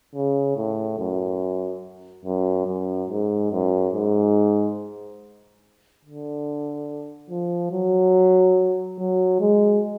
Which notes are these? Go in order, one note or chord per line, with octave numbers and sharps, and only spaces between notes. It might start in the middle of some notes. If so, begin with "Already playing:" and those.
C#3
A2
F#2
F#2
F#2
G#2
F#2
G#2
D3
F3
F#3
F#3
G#3